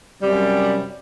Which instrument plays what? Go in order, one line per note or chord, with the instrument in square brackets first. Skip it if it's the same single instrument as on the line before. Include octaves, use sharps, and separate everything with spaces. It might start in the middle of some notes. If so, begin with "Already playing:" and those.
[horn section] F#2 C3 G3